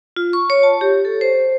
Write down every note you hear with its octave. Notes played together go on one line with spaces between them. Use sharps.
F4
C#6
C#5
A5
G4
A4
C5